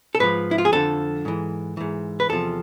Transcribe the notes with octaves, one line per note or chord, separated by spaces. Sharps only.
A4
G#2 F3 B4
E4
F4
G#4
F2 D3 F3 A4
G#2 E3
G#2 E3
B4
E2 C3 F3 A4